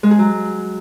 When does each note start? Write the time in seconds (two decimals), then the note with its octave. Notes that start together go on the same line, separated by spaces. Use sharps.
0.03 G#3
0.11 G#4
0.19 F#3